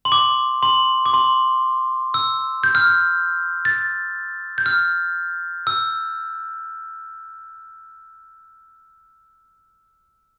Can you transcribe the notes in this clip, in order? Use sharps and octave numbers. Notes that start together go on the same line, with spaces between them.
C6
D6
C6
D6
C6
E6
G6
F6
G6
A6
G6
F6
E6